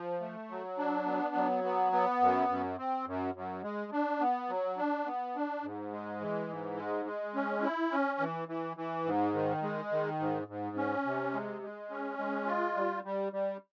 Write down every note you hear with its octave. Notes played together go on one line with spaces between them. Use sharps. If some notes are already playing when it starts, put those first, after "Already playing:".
Already playing: F3
A3
F#3
D4
B3
F#3
B3
B3
F#2
F#2
C4
F#2
F#2
G#3
D4
B3
F#3
D4
B3
D4
G#2
G#3
E3
G#2
G#3
G#3
C#4
E4
C#4
E3
E3
E3
G#2
D#3
G#3
D#3
G#2
G#2
C#4
C3
G#3
G#3
C#4
G#3
F4
G3
G3
G3